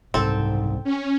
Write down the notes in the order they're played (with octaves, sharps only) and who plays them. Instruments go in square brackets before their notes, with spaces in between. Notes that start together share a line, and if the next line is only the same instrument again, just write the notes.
[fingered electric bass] F#1 C2 [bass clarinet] G#2 [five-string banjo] C4 A4
[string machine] C#4